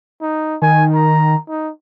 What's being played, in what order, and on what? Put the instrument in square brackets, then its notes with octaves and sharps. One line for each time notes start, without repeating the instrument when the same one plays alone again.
[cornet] D#4
[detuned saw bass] D#3 [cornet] G#5
[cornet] A#5
D#4